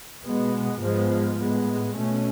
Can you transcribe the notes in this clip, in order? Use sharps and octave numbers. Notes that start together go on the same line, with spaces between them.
B2 G#3 B3
G#2 F3 G#3 B3
A2 G#3 B3
B2 A3 C#4